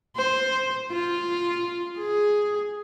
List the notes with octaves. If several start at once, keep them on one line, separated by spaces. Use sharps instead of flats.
C5
F4
G#4